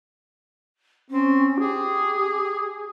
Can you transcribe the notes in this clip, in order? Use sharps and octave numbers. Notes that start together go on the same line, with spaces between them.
C4 C#4
G4 G#4